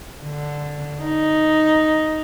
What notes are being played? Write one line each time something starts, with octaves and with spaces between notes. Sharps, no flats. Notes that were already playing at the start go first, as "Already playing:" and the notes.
D3
D#4